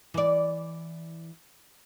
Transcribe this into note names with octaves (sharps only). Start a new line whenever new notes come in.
E3 D5